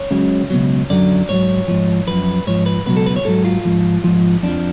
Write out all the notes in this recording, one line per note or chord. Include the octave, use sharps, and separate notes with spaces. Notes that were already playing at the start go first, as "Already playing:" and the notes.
Already playing: C#5
C#2 C#3 F#3
C#2 B2 F#3
F#2 D3 F#3 D5
G#2 F#3 C#5
G#2 F3
F#2 F3 B4
G#2 F3 C#5
B4
C#2 B2 F#3 B4
A4
B4
C#5
G#2 F#3 A4
F4
G#2 F3
G#2 F3
F2 F3 D4